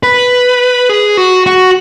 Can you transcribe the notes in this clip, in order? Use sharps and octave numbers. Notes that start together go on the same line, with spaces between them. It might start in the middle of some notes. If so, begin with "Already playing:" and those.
B4
G#4
F#4
F#4